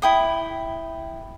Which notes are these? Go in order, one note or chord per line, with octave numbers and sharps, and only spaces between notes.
E4 G5 D#6